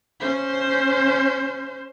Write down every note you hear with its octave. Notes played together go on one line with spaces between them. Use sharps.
C#4 C5